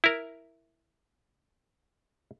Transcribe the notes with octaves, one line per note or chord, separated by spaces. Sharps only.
E4 A#4